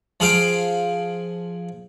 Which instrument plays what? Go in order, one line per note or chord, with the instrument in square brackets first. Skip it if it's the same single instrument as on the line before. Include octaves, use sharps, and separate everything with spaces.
[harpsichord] F3 G#4 F5 G5